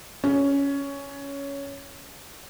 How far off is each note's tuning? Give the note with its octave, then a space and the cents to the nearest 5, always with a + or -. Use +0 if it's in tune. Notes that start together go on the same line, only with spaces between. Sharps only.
C#4 +10